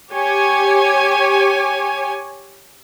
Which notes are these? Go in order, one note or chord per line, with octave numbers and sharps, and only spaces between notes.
G4 C#5 G#5